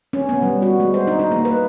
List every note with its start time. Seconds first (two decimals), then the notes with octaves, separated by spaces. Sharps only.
0.13 C#4
0.29 B3
0.42 G3
0.62 F#4
0.80 G#3
0.94 C5
1.07 D#4
1.19 D#4
1.31 A#3
1.45 B4